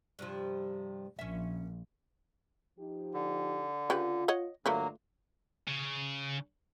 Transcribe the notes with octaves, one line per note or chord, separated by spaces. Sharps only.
G2 C3 F3
A#1 C#4 E5
F3 D#4 G4
D3
C#3 F4 G4 B4
C#5 D#5 F#5
G2 D3 F#3 A3 A#3 F4 B4 D5
C#3